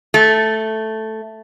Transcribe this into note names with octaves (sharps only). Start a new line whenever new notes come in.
A3